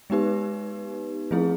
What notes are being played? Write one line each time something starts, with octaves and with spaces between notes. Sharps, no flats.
G#3 B3 D#4 G4 B4
F3 A3 C4 E4 G#4